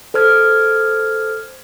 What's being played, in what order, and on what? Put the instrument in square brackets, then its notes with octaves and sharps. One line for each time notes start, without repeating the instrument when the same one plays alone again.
[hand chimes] A4 C5 F6 G#6